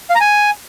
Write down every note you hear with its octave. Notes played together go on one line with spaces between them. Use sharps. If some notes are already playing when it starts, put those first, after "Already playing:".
F5
A#5
G#5